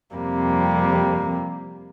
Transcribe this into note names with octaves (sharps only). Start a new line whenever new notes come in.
F2 C3 G3 A#3